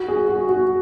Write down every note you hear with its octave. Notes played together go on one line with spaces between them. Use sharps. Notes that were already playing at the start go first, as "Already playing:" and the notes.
Already playing: F#4
G#4
F#4
F#4